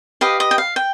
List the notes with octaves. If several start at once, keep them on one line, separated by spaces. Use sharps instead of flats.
G4 B4 D#5 F5
D#5
G5
F5
G5